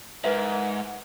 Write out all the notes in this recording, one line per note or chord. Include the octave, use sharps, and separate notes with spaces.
G#2 A#4 B4 E5